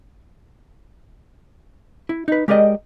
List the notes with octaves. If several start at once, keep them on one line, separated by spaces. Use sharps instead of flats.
E4
D#4 B4
G#3 G4 A#4 D5 D#5 G5